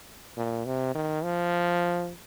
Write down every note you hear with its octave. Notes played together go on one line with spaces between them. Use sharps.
A#2
C3
D#3
F3